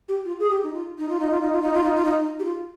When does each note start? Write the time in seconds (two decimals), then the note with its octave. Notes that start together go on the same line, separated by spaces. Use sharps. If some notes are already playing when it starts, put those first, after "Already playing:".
0.09 G4
0.25 F4
0.40 G#4
0.50 G4
0.63 D#4
0.73 F4
0.98 D#4
1.09 F4
1.20 D#4
1.30 F4
1.41 D#4
1.52 F4
1.62 D#4
1.74 F4
1.84 D#4
1.94 F4
2.05 D#4
2.20 D#4
2.39 G4
2.44 F4